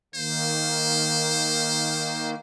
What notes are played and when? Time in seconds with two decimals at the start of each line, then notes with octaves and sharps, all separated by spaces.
0.14 D#3 A#3 C5